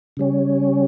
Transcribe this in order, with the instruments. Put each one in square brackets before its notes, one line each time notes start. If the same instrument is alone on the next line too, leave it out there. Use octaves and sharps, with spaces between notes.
[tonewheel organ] C#3 G3 C#4